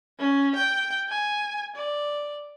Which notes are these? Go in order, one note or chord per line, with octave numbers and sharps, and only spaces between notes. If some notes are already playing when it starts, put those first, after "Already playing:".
C#4
G5
G#5
D5